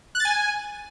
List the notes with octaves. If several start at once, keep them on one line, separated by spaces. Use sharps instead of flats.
F#6
A6
G#5